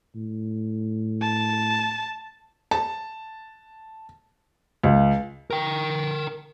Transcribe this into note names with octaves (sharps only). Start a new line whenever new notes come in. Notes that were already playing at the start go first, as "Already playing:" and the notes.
A2
A5
A5
C#2
A#4 G5